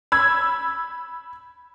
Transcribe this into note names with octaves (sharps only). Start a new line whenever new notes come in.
B5 E6 G#6